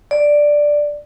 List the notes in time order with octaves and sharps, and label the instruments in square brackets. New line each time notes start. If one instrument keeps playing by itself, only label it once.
[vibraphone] D5